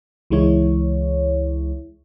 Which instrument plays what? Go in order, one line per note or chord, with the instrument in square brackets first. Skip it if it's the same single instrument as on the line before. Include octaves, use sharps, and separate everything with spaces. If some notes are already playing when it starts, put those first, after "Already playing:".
[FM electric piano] C#2 E3 G#3 E4 C#5